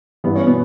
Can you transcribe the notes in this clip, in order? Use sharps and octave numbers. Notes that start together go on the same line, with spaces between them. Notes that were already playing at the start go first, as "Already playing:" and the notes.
G2 E3 B3
C#4
B2 B3